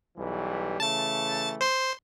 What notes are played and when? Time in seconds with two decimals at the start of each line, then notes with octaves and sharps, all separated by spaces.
0.17 B1 E3 G3
0.80 C#3 E3 A3 A5 A6
1.61 C5 C6